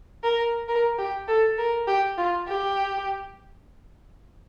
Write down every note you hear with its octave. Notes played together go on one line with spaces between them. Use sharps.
A#4
A#4
G4
A4
A#4
G4
F4
G4